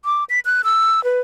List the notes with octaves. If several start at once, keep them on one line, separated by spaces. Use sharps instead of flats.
D6
B6
F#6
E6
B4